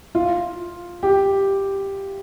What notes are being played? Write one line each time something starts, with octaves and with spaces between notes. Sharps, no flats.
F4
G4